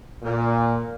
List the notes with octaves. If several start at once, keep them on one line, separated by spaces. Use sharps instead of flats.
A#2